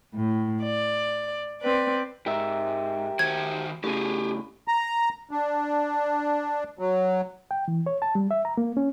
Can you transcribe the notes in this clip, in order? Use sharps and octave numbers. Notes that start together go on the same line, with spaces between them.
A2
D5
C4 B4 D5
G#2 G4 A#4 E5
D#3 F#4 C5 G#6
A2 C#3 G4 G#4
A#5
D4
F#3
G5
E3
C#5
A5
G3
E5
A#5
A#3
C#4